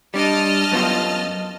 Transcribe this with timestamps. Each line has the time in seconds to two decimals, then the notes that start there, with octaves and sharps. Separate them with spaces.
0.14 G3 D4 D#5 A5 F6
0.71 F#2 B3 F4